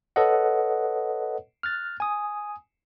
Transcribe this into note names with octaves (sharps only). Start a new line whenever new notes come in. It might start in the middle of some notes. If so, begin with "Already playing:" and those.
A4 B4 C#5 D#5 F#5
F6 F#6 A6
G#5 D#6